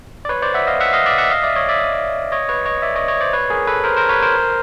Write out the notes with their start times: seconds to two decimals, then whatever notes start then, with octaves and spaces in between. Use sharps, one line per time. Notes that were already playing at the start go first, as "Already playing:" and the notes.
0.25 D5
0.29 B4 C#5
0.42 C5 D5
0.54 E5 F#5
0.67 D#5 F5
0.80 E5 F#5
0.93 D#5 F5
1.06 D5 E5
1.18 E5 F#5
1.31 D#5 F5
1.43 D5 E5
1.56 C#5 D#5
1.69 D5 E5
2.32 C#5 D#5
2.49 B4 C#5
2.66 C#5 D#5
2.82 D5 E5
2.95 C#5 D#5
3.08 C#5 D#5
3.21 C5 D5
3.33 B4 C#5
3.50 G#4 A#4
3.67 A4 B4
3.84 A#4 C5
3.97 A#4 C5
4.09 B4 C#5
4.22 A#4 C5